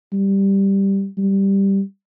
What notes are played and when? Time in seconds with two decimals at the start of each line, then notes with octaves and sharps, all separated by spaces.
0.13 G3
1.18 G3